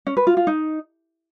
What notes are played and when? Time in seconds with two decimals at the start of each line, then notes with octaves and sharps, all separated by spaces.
0.07 C#4
0.17 B4
0.27 F4
0.37 F4
0.47 D#4